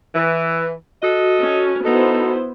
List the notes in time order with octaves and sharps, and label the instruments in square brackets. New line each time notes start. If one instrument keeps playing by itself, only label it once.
[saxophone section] E3
[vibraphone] F#4 [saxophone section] A4 D#5
[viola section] C#4
[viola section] B3 E4 C5 [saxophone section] D#4 A4